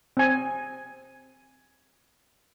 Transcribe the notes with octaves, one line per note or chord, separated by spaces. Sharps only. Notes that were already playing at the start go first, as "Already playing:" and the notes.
C4 G#5